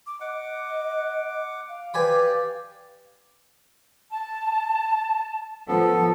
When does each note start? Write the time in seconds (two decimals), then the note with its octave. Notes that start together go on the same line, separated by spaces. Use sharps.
0.06 D6
0.21 D#5 F#5 D6
1.69 F5
1.94 G4 B4 D5 G#5 B5
4.11 A5
5.68 F3 B3 A4